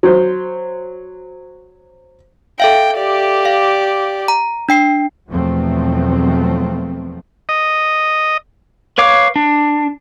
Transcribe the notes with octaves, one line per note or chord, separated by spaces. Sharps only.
F#3 C5
A4 E5 F5 G5
G4 D5
F5
A#5
D4 G5 C7
E2 B2 F3 F#3 A3 C4
D#5
B4 C#5 F5 D6
D4